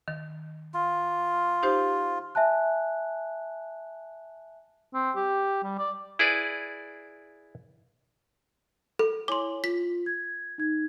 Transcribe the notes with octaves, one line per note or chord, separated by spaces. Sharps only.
D#3
F4
D#4 G4 C5
E5 G#5 A5 F#6
C4
G4
G3
D5
E4 G#4 B4 D5
A4
E4 C#5 G#5 C6 D6
F4 B6
G#6
D#4 G#6